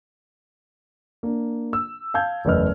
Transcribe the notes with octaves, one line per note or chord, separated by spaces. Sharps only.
A#3 D4
E6
F5 A5 G6 G#6
F#1 E2 A3 B4 D#5 F6